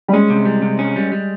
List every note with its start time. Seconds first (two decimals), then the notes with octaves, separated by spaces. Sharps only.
0.08 G3
0.13 G#3 C#4
0.30 C3
0.45 G3
0.62 C3
0.79 C#4
0.96 G3
1.12 G3